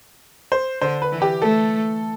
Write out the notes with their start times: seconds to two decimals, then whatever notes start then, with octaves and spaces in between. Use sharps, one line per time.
0.52 C5
0.82 D3 C5
1.02 B4
1.12 E3
1.22 G4
1.42 A3 A4